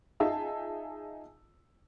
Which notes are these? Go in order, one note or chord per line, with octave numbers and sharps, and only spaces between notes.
D#4 F4 G#4 E5 A5